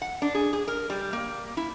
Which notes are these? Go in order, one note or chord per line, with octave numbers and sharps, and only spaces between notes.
F#5
D4
G#4
G#4
A#4
G3
A#3
E4